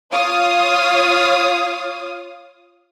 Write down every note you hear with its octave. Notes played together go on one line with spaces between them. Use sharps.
F4 C#5 F5 D#6